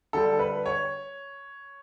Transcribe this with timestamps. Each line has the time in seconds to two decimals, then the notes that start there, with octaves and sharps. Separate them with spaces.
0.13 D3 G3 A4
0.39 B4
0.66 C#5